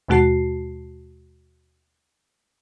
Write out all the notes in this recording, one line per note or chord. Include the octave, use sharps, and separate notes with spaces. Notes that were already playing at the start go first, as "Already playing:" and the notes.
D#2 B2 G#3 F#4 A5 C7